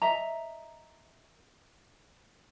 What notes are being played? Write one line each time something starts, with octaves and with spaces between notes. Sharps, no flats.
D#5 E5 A#5